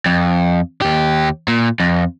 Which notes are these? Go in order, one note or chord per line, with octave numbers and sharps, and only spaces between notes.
F2
D#2 G4
A#2
F2